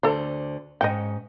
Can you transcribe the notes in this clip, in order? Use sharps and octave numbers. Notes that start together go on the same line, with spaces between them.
D2 D3 A4 C5 D5
G#2 C#4 D#5 G5